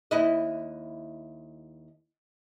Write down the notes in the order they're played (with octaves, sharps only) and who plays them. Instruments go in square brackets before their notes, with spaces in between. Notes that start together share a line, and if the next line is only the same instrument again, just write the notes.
[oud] D#2 E4 D#5